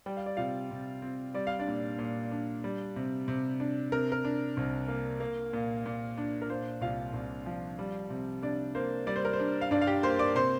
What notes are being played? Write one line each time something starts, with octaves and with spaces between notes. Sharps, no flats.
G3 G5
F5
D5
C3 F4 F5
C3
C4
G3 D5
F5
D4 D5
A#2
A#2
D4
G3
C3
C3
D4
C3 A#4
A#4
D4
C2
A#3
A#3
A#2
A#2
D4
A#4
A#2 C5
C2 F4 F5
C2
F3
G3
C3
C3 D4 D5
A#3 C5
G3 D5
C5
A#4
C5
D4
F5
G2 D4 D5
F5
G4 G5
A#3 C5 C6
D5 D6
C3 C5 C6